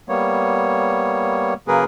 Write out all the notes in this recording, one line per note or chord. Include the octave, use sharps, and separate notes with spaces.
G3 A#3 B3 C#5
C#3 F#3 A#3 G#4 A#4 B4